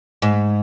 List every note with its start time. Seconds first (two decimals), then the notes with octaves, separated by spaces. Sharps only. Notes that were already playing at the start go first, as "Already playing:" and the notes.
0.22 G#2